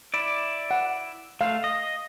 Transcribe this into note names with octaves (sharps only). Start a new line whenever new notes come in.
E4 D5
F#5
A3 F5
D#5